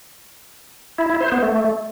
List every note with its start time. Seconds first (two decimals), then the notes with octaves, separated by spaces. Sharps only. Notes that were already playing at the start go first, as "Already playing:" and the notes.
0.98 E4
1.10 E4
1.21 C5
1.32 B3
1.43 A3